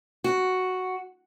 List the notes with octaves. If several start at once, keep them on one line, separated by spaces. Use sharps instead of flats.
F#4